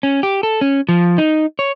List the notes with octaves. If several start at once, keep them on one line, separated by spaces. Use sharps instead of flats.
C#4
G4
A4
C#4
F3
D#4
C#5